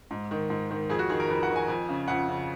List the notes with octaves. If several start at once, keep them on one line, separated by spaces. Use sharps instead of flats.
G#2
D#3
G#2
D#3
F2 G#4
F#4
D#3 G#4
A#4
F2 B4
F#5
D#3
G#5
F2
C#3
F2 F#5
C#3